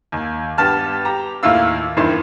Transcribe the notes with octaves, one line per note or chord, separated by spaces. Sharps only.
D#2
G2 B3 G4 A5 F6
G4 A#5
D#2 A2 E4 F4 F5 E6
E2 G2 D#3 E4 C5